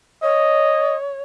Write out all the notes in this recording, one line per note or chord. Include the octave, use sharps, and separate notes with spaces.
C#5 D#5